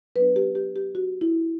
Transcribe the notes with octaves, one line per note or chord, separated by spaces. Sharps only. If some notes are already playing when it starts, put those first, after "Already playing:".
F#3 B3 D4 B4
G4
G4
G4
F#4
E4